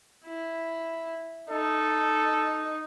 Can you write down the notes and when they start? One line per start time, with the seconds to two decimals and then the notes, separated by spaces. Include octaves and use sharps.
0.26 E4
1.50 D#4 A4